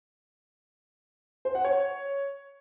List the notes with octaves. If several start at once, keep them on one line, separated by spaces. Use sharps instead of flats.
C5
F#5
C#5